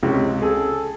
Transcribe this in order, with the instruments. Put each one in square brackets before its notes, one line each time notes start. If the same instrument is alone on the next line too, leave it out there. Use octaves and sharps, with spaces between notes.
[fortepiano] C#2 C3
[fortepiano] G#4 [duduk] A4